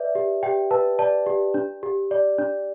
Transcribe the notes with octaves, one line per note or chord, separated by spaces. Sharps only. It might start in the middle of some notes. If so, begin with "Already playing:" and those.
Already playing: B4 D5 E5
G4
G4 G5
B4 A5
D5 A5
G4
D4
G4
D5
D4